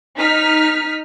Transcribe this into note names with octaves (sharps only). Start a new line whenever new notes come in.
D#4 F6 B6